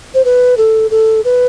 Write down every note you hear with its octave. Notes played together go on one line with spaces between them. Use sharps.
C5
B4
A4
A4
B4